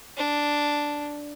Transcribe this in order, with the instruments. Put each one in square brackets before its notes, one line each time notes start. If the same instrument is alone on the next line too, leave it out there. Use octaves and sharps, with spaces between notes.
[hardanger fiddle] D4